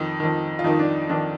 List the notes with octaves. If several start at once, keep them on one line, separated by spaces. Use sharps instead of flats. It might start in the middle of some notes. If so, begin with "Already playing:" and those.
Already playing: F2 D#3 D#4
F2 D#3
F4
F2 D#3 D#4
D4
F2 D#3 D4